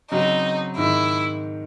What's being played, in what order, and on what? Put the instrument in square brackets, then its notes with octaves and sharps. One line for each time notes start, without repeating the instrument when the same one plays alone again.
[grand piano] C#3 F#3 C4 [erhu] D#4
[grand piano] G#2 D#3 G#3 [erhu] E4